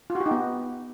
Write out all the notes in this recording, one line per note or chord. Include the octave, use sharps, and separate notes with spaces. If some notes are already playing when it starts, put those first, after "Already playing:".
F4
F#4
G4
D#4
B3